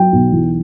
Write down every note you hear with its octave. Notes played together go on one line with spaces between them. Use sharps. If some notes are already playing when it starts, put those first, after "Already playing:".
Already playing: F#3 G5
B1
E2